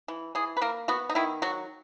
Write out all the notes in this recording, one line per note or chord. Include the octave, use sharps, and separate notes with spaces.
E3
E3 G#4
B4
A#3 A#4
B3 F#4
D#4
D#3 E4
F#3 F#4